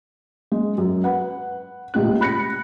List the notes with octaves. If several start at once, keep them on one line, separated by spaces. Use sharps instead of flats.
G#3
F#2
B4 F#5
D#1 C#2 A2 F4 F#6
B5 F#6 A#6 C#7